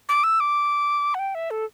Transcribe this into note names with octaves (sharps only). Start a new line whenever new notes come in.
D6
E6
D6
F#5
G5
E5
A4